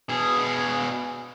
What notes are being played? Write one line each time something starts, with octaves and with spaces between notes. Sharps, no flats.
B2 G#4